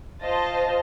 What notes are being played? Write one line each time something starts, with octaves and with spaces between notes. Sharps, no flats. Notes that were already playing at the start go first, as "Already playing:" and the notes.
F4 C5 D#5 A5